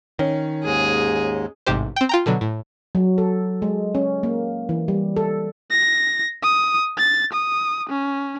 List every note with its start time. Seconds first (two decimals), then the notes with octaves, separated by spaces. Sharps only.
0.19 D#3 C#4
0.65 D#2 G#2 G#3 G#4
1.67 A1 G#2 C3 G4 C5
1.96 C4 G5
2.09 F4 G5 A#5
2.26 B2 D3 F#3
2.41 A2
2.95 F#3
3.18 A4
3.62 G#3
3.95 C#4
4.23 A#3
4.69 E3
4.88 G3
5.16 A4
5.70 A#6
6.43 D#6
6.98 A6
7.33 D#6
7.89 C#4